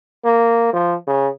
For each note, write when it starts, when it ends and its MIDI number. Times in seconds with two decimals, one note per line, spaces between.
0.25 0.70 58
0.73 0.95 53
1.07 1.28 49